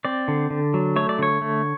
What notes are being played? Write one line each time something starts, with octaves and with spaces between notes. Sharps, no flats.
C4 D5
D3
D3
F#3
A3 C#5
D5
D3 C#5
A3